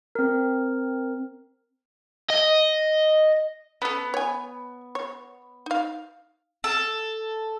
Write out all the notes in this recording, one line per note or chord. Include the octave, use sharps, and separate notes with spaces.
C4 A#4
D#5
B3 C#4 A4
C#5 G#5
C#5
D#4 F5
A4